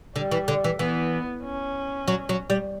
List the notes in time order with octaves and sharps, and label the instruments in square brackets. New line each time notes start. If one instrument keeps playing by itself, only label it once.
[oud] D3 [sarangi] G3
[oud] E3
D3
E3
[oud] E3 [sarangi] B3
[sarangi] C#4
[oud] F#3
F#3
G3